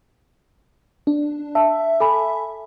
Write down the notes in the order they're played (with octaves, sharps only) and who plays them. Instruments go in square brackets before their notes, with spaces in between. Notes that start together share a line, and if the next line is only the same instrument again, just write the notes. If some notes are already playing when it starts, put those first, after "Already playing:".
[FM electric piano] D4
[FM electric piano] E5 [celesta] A5
[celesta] A4 G#5 B5